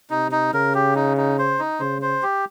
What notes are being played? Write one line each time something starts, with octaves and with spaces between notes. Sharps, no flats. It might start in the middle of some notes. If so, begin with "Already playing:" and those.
C3 D#4
D#4
C#3 A#4
G4
D#4
D#4
C5
D#4
C#3 C5
C5
G4